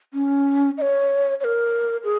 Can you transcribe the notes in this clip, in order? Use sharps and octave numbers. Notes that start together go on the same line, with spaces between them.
C#4
D#5
C#5
C#5
A#4
G#4